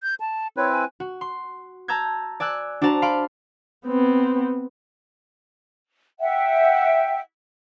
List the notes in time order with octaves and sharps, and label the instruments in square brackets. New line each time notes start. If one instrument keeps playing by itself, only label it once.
[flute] G6
A5
[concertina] C4 E4 B4 [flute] C#5
[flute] G#5
[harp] F#4
C6
A5 A#5 E6 G6 G#6
D5 G#5 E6 F#6
D4 F#4 C5 A5 A#5
F5 B5 C6 F6 D7
[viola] B3 C4
[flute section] E5 F#5 G5